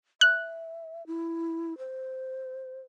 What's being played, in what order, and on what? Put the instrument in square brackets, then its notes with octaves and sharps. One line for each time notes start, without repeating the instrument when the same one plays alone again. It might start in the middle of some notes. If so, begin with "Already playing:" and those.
[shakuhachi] E5 [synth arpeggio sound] F#6
[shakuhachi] E4
C5